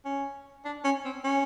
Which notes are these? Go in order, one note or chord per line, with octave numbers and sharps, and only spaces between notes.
C#4
D4
C#4
C4
C#4